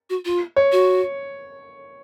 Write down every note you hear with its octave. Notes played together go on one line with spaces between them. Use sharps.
F#4
F4
C#5
F#4